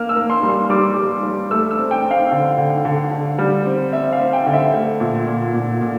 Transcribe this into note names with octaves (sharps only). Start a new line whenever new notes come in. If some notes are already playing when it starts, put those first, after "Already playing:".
Already playing: A#3 F6
E6
A#3
C6
G3
C6
G3 D6
G3
G3
A3 E6
E6
C4
G5
C4
F5
D3
D3
D3
D3
G3
C4
C4 E5
F5
C4
G5
D3
E5
A3
A#2
A#2
A#2
A#2